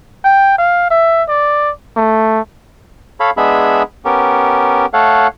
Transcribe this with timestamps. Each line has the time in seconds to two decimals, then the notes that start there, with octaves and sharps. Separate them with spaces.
0.25 G5
0.58 F5
0.91 E5
1.28 D5
1.97 A3
3.20 A4 C#5 F5 B5
3.37 G#3 B3 D4 G#4 E5 B5
4.05 B3 C#4 G4 A#4
4.93 A3 A4 C#5 F5 F#5